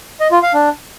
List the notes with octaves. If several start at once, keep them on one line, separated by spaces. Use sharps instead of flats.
D#5
F4
F5
D4